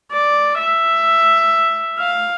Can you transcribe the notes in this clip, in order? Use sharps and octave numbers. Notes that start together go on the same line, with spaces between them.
D5
E5
F5